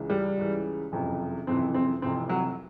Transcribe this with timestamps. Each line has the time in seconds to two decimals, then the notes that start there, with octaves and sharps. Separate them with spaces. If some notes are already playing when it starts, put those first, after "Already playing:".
Already playing: C#2 C#3 E3
0.10 G3
0.37 C#2 C#3 E3
0.92 F#1 F2 C3 E3
1.47 F#1 F2 C3 E3 C4
1.74 C4
2.02 F1 F2 C3 E3 C4
2.29 F#3